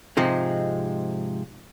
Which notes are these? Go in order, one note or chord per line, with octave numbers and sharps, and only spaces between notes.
G#2 C3 F3 G#3 D#4